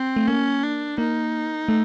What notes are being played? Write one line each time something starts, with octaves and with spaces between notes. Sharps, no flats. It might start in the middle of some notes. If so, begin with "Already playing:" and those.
Already playing: C4
A3
A#3 C#4
D4
A#3 D#4
A3